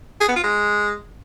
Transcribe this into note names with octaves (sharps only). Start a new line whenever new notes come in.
G#4
B3
F4
G#3